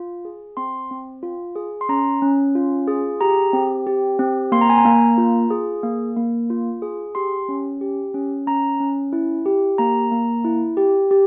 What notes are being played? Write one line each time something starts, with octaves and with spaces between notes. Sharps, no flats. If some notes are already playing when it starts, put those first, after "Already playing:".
Already playing: F4
G#4
C4 C6
C4
F4
G#4
C6
C#4 A#5
C#4
F4
G#4
G4 A#5
C4
G4
C4
A#3 C6
A#5
G#5
A#5
A#3
F4
G#4
A#3
A#3
F4
G#4
G4 C6
C#4
G4
C#4
C#4 A#5
C#4
E4
G4
A#3 A#5
A#3
E4
G4
G4